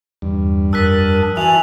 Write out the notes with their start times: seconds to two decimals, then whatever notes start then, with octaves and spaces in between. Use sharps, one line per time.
0.22 E2 G2
0.73 F2 A#4 A5 D#6 E6 F#6 B6
1.37 E3 F#4 E5 G#5 A5 F7 F#7